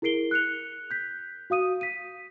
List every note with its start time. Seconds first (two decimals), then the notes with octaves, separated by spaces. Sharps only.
0.02 E4 G#4 A#4 C7 D7 G7
0.31 F#6 C#7 F7
0.91 G6 B6
1.50 F#4 F5 D#6 D#7
1.81 B6 D#7